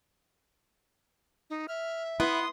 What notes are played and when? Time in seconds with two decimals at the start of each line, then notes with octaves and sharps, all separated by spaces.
1.50 D#4
1.68 E5 F6
2.20 B3 E4 C6 D#6